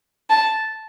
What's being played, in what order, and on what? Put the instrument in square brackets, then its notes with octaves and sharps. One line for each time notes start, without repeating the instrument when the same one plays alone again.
[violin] A5